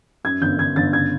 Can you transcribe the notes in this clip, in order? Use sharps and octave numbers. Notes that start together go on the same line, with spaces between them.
F#2 G#6
G1 G6
G1 G#6
G1 A6
C#3 G#6